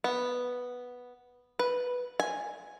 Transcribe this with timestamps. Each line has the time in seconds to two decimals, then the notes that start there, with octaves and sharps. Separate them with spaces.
0.04 B3
1.59 B4
2.20 G#5